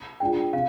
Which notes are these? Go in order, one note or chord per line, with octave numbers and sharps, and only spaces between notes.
G#3 D4 F4 G5
C3 F5